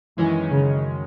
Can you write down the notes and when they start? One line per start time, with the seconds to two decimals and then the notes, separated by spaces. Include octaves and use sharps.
0.18 F#2 D#3 E3 G#3 C#4
0.51 C#3